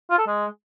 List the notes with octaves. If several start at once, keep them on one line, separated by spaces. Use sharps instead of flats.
F4
A4
G#3